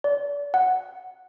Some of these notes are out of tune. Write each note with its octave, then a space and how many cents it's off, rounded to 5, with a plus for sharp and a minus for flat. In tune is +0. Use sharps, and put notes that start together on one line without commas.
D5 -35
F#5 +0